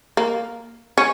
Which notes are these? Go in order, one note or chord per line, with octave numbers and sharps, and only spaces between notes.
A#3
C#4